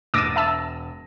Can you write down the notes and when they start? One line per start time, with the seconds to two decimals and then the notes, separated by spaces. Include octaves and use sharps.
0.14 E1 D6 E6 A6 A#6 D#7
0.36 E5 A5 E6